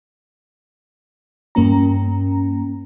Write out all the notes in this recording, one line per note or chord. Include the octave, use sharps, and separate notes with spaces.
G2 A#3 C#4 A#5